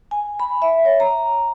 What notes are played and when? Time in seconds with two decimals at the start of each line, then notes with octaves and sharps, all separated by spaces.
0.11 G#5
0.40 B5
0.62 E5
0.85 C#5
1.00 A#5